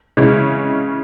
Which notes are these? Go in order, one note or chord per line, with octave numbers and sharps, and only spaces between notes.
C#3 E3 G#3 C#4 E4